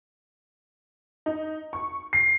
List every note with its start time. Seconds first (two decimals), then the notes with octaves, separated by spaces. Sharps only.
1.26 D#4
1.73 C#6
2.13 C7